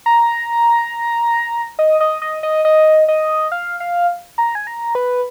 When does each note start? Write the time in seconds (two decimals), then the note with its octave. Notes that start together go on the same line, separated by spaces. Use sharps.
0.06 A#5
1.79 D#5
2.00 D#5
2.22 D#5
2.43 D#5
2.65 D#5
3.08 D#5
3.52 F5
3.80 F5
4.38 A#5
4.55 G#5
4.67 A#5
4.95 B4